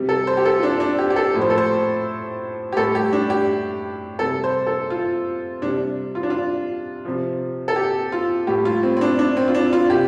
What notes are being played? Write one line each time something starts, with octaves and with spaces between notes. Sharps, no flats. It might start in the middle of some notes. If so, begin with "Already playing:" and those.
Already playing: C3 G3
A4
C5
G4
A4
F4
D4
D4
G4
G4
A4
A2 F3
C5
A4
C5
G4
A2 G3 A4
G4
D4
G4
C3 G3 A4
C5
A4
F4
C3 G3 D4
F4
D4
F4
C3 F3
A4
G4
F4
A2 G3 G4
F4
C4
C4
D4
D4
C4
F4
D4
F4
C3 G4